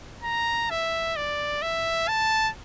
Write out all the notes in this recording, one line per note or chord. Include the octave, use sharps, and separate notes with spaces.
A#5
E5
D5
E5
A5